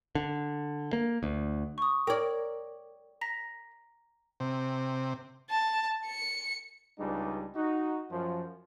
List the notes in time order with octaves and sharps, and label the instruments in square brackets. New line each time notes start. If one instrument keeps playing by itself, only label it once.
[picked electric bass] D3
A#3
D2
[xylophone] C#6 D#6
[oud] A#4 D5 [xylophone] G5 G#6
[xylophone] A#5 A#6 B6
[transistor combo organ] C3
[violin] A5
C#7
[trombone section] C#2 G3 G#3 D4 D#4 B4
D#4 F#4
F#2 F3 C5